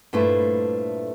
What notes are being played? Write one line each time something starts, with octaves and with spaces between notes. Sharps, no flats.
G2 A#2 A3 D4 E4 C5